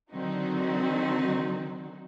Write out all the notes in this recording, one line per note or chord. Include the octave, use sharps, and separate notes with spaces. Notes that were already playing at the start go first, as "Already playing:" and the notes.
D3 D#3 F#3 C4 D#4 F#4